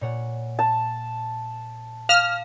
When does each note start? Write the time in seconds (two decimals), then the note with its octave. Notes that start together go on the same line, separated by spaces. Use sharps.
0.01 A#2 C#5 F#5
0.59 A5
2.09 F5 F6